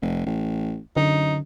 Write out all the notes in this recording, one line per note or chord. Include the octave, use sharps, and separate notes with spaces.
F1
A1
F#2 D3 D#4